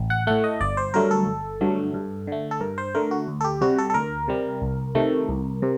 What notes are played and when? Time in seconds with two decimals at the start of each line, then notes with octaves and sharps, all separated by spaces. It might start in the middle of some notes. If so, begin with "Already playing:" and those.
Already playing: A1
0.10 F#5
0.27 A2 A3 F#5
0.44 D#5
0.61 G1 D5
0.77 C5
0.94 G2 D3 F#3 A3 A#4
1.11 A4
1.27 G1
1.61 G2 D3 F#3 A3
1.94 G2
2.27 D3 A3
2.51 A4
2.60 G2 A#4
2.78 C5
2.95 D3 A3 A#4
3.11 F#4
3.28 D2
3.41 A4
3.44 G4
3.61 C3 G3 F#4
3.78 A4
3.90 A4
3.94 D2 A#4
4.28 C3 G3
4.62 C2
4.95 C3 D#3 A3
5.29 C2
5.62 C3